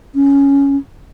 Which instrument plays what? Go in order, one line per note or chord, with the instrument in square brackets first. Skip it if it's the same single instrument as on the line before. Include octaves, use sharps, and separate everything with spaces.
[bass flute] C#4